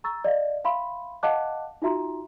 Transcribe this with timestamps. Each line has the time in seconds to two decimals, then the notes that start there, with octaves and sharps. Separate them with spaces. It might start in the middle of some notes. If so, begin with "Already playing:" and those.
0.04 A#5 C#6 E6 A6
0.24 D5 D#5 F5
0.64 E5 F5 B5 C6
1.23 D#5 F5 F#5 A5 D6 F#6
1.82 D#4 F4 F#4 E5 A#5 C6